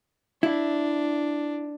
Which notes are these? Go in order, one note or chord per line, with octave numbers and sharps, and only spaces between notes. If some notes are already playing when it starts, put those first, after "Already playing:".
D4 E4